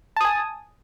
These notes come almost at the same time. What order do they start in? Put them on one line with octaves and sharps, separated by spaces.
A5 D#6 G#5